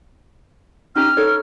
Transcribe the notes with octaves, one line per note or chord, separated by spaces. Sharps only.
C#4 D#4 G4 F6
D#4 A4 C#5